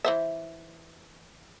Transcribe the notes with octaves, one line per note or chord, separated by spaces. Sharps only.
E3 C5 E5